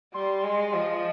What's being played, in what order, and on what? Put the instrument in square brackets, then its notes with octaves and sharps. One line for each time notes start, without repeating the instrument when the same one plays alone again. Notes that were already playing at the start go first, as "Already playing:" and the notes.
[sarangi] G3 [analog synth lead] C6
[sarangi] G#3
[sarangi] F3 [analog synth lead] D#5
[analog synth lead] D#5